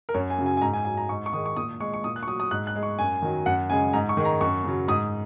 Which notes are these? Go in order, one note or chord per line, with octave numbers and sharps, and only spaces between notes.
A#4
F#2 C#5
G#5
C#3 F#3
G#5
G#5
G#2 A#5
G#5
F#3 G#5
A#5
G#2 C#6
C#6
D#3 G#3 D#6
C#6
A#2 D#6
G#3 C#6
C#6
A#2 D#6
F#6
C#6
F#3 D#6
D#6
G#2 F#6
F#6
G#3
C#6
F#2 G#5
D#3 F#3
F#2 F#5
C#3 G#3 G#5
G#2 A#5
C#6
D#3 G#3
A#5
F#2 C#6
C#3 F#3
G#2 D#6